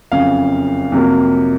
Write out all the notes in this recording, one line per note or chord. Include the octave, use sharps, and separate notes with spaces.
F#1 F2 C#3 F5
F2 C3 F#3 A#3